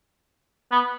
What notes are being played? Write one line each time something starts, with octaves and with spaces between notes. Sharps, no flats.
B3